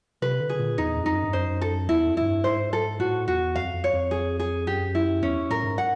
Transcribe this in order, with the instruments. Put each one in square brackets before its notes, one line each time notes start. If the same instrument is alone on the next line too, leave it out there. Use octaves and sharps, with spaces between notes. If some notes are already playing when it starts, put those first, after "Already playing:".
[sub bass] C3 [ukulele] B4
[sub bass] D3
[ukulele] G#4
[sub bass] A#2
[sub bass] E2 [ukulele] D#4
[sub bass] F2
[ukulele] D#4
[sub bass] F#2
G2
[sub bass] F#2 [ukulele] C5
[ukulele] A4
[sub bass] E2 [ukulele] E4
[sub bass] F2
[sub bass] G#2 [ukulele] E4
[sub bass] G2
[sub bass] G#2 [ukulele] C5
[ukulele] A4
[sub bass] A2 [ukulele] F#4
[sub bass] E2 [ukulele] F#4
[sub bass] F2 [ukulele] F5
[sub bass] F2
[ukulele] C#5
[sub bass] F2
[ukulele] G#4
G#4
[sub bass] F#2 [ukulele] G4
[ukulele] E4
[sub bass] E2 [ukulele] C#4
[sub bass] A2 [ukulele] A#4
[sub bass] G#2
[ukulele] F#5